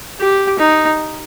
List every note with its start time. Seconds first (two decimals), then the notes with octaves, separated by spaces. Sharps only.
0.20 G4
0.59 D#4